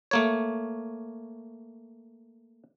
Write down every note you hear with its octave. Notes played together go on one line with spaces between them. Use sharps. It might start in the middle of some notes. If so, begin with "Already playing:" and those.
A3 A#3 C#5